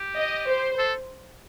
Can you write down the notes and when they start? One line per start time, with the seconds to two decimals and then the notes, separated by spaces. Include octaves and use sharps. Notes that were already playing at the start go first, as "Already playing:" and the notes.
Already playing: G4
0.15 D#5
0.47 C5
0.79 A4